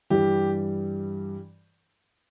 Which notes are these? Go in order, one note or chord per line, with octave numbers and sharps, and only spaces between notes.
G2 E3 G3 G4